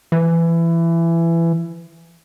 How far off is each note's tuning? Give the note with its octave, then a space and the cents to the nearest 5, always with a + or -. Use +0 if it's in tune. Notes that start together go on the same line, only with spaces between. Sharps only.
E3 +20